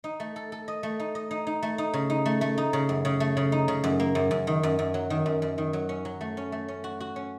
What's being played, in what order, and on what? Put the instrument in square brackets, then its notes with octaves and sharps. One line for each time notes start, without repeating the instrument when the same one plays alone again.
[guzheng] D#4
A3
A4
A4
D#5
A3
D#4
D#5
D#4
D#4
A3
D#4
C#3
D#4
A3
A3
D#4
C#3
F#2
C#3
A3
C#3
D#4
C#3
F#2
A#3
F#2
F#2
D#3
F#2
F#2
F#3
D#3
F#2
F#2
D#3
F#3
C#4
F#3
A3
C#4
A3
C#4
F#4
F#4
C#4